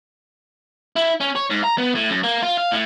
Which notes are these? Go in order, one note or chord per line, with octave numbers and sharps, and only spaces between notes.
E4
C#4
C#5
G#2
A#5
B3
A2
F#2
A#3
F4
F5
A2